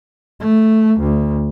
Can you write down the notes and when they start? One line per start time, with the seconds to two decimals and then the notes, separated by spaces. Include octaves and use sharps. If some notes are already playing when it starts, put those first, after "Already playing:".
0.40 A3
1.00 D2